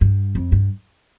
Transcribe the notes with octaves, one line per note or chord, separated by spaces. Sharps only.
G2
F2
G2